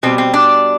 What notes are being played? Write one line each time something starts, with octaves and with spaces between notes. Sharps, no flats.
B2 G3 C4
C4
D4